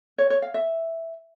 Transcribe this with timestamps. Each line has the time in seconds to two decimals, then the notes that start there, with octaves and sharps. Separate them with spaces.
0.18 C#5
0.30 C#5
0.42 F5
0.54 E5